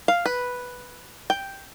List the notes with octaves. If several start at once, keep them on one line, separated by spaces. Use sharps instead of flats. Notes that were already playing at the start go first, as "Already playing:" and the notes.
F5
B4
G5